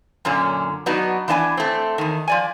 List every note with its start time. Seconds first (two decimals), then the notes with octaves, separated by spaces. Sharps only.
0.25 F#2 A#2 D3 C#4
0.86 F#3 B3 D4 D#4 F#4
1.28 E3 B3 D4 D#5 G#5
1.57 A3 C4
1.98 E2 D#3
2.28 F3 D5 G#5